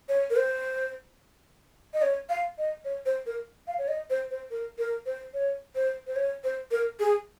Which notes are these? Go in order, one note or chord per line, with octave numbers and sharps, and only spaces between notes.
C#5
A#4
C5
D#5
C#5
F5
D#5
C#5
C5
A#4
F5
C#5
D#5
C5
C5
A#4
A#4
C5
C#5
C5
C5
C#5
C5
A#4
G#4